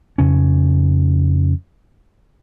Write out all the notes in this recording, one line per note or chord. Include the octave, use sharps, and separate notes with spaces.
F2 C#3 C#4